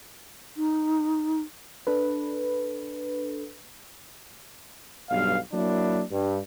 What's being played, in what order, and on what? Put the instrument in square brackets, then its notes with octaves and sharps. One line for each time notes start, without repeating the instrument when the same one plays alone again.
[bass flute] D#4
[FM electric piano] D4 A4 B4
[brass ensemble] B1 G2 F5
F#3 A#3 D4 E4
G2